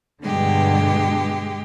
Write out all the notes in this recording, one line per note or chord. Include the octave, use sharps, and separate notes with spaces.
G2 B2 D3 G#3 G4